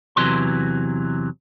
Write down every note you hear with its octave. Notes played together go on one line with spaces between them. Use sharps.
E2 C3 E3 F#3 C6